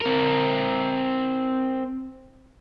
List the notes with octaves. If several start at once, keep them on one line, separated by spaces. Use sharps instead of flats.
C4 A#4